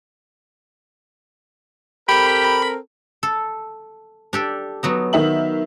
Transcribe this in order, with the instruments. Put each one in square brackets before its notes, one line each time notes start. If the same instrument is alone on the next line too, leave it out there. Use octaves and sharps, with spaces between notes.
[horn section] C4 A4 A#4 [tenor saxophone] G4 [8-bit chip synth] B5
[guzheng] A4
D4 G4 A4
F#3 B3 D#4
[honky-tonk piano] D#3 E5 F#7